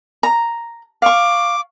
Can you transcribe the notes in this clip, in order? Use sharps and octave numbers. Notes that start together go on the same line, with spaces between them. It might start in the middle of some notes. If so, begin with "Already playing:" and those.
A#5
F5 C#6 D6